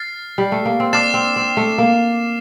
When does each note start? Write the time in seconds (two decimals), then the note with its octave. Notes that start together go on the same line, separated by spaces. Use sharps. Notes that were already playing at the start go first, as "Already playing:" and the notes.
Already playing: F6 A6 C7
0.38 G3
0.52 A3
0.65 A#3
0.80 C4
0.93 D4 D6 F6 A6 C7 E7
1.14 C4
1.36 C4
1.57 A3
1.78 A#3